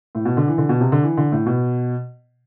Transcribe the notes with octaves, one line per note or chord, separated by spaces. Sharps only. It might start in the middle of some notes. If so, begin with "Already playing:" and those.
A2
B2
D3
E3
D3
B2
C3
D3
E3
D3
A2
B2